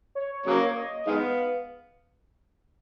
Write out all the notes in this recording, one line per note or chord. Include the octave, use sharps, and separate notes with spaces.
C#5
C#3 F#3 A#3 C#5
D#5
D#3 G#3 B3 F5